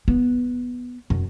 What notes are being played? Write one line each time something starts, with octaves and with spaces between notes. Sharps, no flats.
B3
F#2